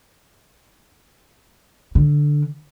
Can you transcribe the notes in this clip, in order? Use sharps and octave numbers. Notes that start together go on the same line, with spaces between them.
D3